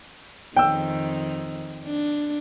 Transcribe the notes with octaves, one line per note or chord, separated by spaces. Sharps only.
F2 D#3 G5 E6
D4